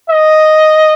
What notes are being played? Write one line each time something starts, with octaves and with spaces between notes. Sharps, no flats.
D#5